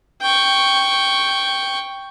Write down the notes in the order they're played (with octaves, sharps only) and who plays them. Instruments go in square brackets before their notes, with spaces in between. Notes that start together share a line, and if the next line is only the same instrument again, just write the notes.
[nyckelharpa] G5 C#6